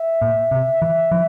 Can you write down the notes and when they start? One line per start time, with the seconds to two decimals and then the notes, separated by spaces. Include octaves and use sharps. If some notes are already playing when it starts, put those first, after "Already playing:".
Already playing: E5
0.21 A#2
0.51 C3
0.82 E3
1.11 F3